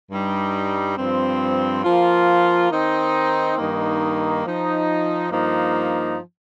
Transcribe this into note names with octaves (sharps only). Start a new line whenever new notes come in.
G2 G3 D#4
G2 F3 C4
F3 A#3 F4
D#3 C4 D#4
G2 D#3 A#3 D#4
F3 D#4
G2 F3 A#3 D#4